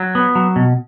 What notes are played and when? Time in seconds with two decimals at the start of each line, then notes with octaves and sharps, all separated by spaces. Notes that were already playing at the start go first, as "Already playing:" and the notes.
Already playing: F#3
0.15 B3
0.35 F#3
0.56 B2